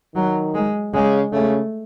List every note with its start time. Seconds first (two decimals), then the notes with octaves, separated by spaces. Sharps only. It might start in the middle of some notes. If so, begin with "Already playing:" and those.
0.15 D#3 F#3
0.55 G#3
0.94 C#3 G#3
1.32 C#3 A3